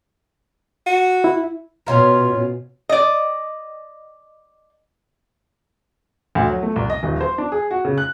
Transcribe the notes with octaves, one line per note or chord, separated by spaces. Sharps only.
F#4
E4
B2 C#4 F4 A#4
D5 D#5
D2
F#3
A3
C2
D#5
D#1
C5
D4
G#4
F#4
C#3
F#6